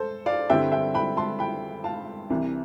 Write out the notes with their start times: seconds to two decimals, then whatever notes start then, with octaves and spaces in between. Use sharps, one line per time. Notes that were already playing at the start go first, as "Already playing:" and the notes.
Already playing: A4 C5
0.26 D5 F5
0.50 G2 D3 G3 C4 E4 E5 G5
0.72 E5 G5
0.94 G5 B5
1.17 A5 C6
1.39 G5 B5
1.84 F5 A5
2.30 C2 C3 E3